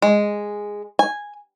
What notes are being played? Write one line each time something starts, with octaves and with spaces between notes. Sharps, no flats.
G#3
G#5